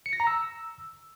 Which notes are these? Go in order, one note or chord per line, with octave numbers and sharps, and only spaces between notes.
C#7
A#6
A#5
E6